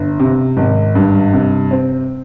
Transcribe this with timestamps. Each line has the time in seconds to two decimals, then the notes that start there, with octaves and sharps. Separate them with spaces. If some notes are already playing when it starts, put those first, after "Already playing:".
Already playing: G1
0.19 C3
0.57 G#1
0.95 G2
1.33 C3
1.71 C4